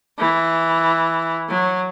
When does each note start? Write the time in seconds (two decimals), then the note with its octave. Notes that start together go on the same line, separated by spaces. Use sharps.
0.19 E3
1.49 F#3